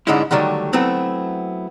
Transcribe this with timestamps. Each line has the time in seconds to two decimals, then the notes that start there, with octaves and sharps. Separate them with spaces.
0.07 G#2 D3 G#3 C#4 D#4 E4
0.31 D3 D#3 F#3 G3 A3
0.73 F#3 A3 B3 C4 E4